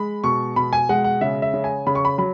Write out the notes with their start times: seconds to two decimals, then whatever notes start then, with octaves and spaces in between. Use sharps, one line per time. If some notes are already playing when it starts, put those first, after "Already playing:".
Already playing: G#3 B5
0.24 B2 C#6
0.56 B2 B5
0.73 G#5
0.89 G#3 F#5
1.04 F#5
1.21 C#3 E5
1.42 E5
1.54 C#3
1.64 G#5
1.87 C#3 B5
1.95 C#6
2.05 B5
2.18 F#3 B5